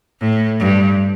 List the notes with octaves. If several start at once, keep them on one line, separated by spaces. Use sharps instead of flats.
A2
G2